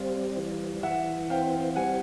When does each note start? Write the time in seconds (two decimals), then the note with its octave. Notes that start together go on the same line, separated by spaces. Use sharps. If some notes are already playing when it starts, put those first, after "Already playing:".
Already playing: G3 C4 D5 F5
0.37 E3
0.83 E3 E5 F#5
1.30 C4 F5 G5
1.76 G3 F#5 G#5